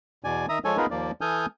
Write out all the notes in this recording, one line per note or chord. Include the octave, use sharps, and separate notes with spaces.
E2 B2 D5 G#5
D#3 E5 A#5 D#6
F3 G#3 A4 C#5 G#5
B3 D#4 F4 G#4 A#4 B4
D#2 F3 A#3 D5
E3 A4 G#5 D#6 F6 G6